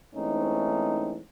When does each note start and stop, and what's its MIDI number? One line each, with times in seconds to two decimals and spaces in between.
0.15 1.19 44
0.15 1.19 52
0.15 1.19 57
0.15 1.19 60
0.15 1.19 61
0.15 1.19 63